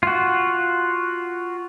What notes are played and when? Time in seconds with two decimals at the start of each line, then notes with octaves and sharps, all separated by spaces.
0.03 F4 F#4